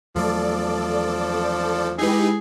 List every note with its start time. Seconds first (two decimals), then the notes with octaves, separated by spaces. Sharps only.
0.16 E2 F3 F#3 A3 A4 D5
1.98 G#3 D#4 E4 G4 G#4 B4